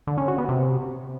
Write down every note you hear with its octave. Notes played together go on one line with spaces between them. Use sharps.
D3
C#4
F#4
B3
C3